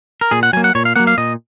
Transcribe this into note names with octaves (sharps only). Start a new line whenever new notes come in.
A#4
A#2 G#4
F#5
F#3 A#3 G#5
F#5
A#2 C#5
F5
F#3 A#3 F#5
F5
A#2 D#5